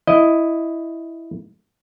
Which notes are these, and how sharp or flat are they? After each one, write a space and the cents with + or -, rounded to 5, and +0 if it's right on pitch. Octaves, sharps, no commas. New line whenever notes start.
E4 +0 D#5 +0